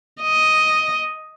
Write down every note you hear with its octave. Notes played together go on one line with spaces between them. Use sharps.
D#5